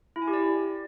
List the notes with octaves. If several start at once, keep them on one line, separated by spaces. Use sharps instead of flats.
E4
G#5
G4
D5